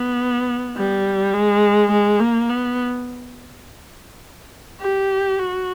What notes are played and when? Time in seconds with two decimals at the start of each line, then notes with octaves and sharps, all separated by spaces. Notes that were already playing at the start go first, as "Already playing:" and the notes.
Already playing: B3
0.76 G3
1.34 G#3
1.92 G#3
2.20 A#3
2.49 B3
4.81 G4
5.39 F#4